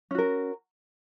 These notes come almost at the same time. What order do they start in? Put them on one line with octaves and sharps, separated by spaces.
C#4 F#4 A#4